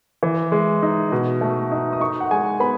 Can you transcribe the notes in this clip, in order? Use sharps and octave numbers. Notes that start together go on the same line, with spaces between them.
E3
G#3
D#4
B2
A3
D#4
D#6
D#4 C#6
F#5
G#3 G#5
B3 B5